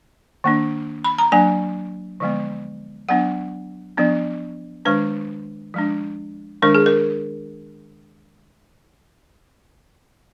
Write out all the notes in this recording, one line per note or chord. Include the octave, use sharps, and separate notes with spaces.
D#3 A#3 D4
B5
A#5
F#3 A#3 D4 G#5
D3 F3 G#3 B3
F#3 B3 D4 F#5
F3 B3 D4
D#3 G#3 D4 B4
F3 G#3 D4
D#3 G#3 D4 A#4
G#4
A#4